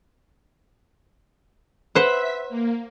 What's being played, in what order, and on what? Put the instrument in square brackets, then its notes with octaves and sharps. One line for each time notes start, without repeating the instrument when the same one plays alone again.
[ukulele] B4 [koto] C5 F#5 [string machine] E5 B6
[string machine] A#3